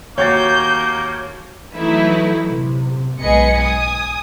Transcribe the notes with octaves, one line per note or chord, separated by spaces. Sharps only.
D#2 A#3 F#4 C#5 G6 A6
E3 F#3 A3 D#4 E4 B4
C3
B1 G#2 G#4 B4 D#5 C#7
G#5 D#6